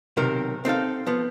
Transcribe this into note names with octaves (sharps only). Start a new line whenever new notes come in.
B1 C3 D#3 A#4
C4 D#4 A4 F5
F3 B3